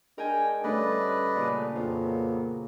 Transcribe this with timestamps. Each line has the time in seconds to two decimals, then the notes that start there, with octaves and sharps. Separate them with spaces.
0.18 G#3 D4 A#4 G5 G#5
0.64 G2 D3 A3 C#4 B4 D5 D#5
1.36 A#2 C#3 D4
1.75 F2 F#3 A#3 B3 F4